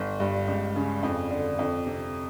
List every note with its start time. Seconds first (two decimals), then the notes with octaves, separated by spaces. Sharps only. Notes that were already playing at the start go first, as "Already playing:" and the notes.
Already playing: G1
0.20 G2
0.47 C#2
0.76 C#3
1.03 F2
1.31 D3
1.59 F2
1.87 C3